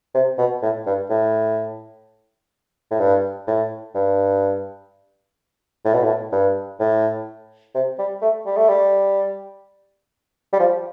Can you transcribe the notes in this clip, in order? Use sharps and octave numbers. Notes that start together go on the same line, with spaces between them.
C3
B2
A2
G2
A2
A2
G2
A2
G2
A2
B2
A2
G2
A2
C3
G3
A3
G3
A3
G3
G3
F3